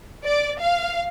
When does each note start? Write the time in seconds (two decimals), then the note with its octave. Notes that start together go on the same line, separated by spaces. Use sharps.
0.25 D5
0.60 F5